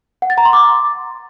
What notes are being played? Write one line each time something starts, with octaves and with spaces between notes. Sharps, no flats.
F#5
A6
A#5
C6
D6